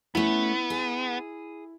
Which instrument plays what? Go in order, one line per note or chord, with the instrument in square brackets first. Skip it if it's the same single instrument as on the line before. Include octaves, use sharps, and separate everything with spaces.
[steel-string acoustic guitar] A3 C#4 [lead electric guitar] B3 [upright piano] E4
[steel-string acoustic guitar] G#4